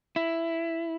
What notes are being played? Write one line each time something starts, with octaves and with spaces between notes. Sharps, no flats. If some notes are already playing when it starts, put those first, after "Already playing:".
E4